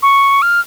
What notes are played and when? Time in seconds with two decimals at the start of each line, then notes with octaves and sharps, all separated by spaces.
0.02 C#6
0.42 F6